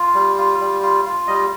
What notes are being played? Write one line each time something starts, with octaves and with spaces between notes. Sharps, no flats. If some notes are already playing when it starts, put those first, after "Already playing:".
Already playing: F4
G3
F4
G3
F4
F4
G3 D#5